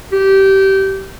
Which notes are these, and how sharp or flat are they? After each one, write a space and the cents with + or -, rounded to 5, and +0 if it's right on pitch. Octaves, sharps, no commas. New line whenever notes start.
G4 -20